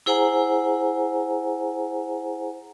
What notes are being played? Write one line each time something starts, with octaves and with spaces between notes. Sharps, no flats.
E4 G#4 C5 F#5 G#5 A#5